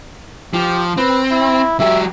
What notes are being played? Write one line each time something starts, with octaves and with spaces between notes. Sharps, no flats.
F3 G4
C4 B4
E4
F#3 G4 E5